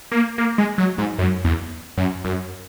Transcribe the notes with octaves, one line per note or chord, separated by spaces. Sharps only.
A#3
A#3
G#3
F#3
G#2
F#2
E2
F#2
F#2